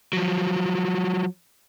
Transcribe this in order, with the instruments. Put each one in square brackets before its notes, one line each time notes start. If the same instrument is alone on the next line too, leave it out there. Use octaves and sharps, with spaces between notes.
[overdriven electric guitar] F3 F#3